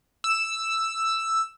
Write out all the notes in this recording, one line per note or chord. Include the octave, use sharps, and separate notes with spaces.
E6